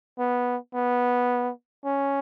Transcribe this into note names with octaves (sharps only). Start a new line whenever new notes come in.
B3
B3
C#4